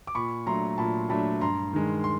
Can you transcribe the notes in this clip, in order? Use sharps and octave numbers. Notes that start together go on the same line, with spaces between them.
D6
A#2 B5 C#6
F#3 A3 D4 A#5 C6
A#2 A5 B5
F#3 A3 D4 A5 B5
G2 A#5 C6
D#3 G#3
C6